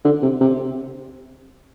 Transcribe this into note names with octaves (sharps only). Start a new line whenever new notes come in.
D3
C3
C3